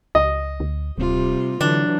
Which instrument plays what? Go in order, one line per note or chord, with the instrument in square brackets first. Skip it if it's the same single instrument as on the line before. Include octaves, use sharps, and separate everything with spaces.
[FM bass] C#2 [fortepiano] D#5
[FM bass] D2
[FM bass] D1 [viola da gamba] C3 G3 F4
[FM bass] D3 [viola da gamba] E3 F#3 [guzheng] D4